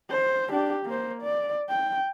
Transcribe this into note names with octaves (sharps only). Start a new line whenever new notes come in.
C5
D4 G4
A#3 C5
D5
G5